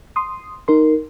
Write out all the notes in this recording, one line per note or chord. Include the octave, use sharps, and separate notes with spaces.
C6 D#6
D#4 A#4 C6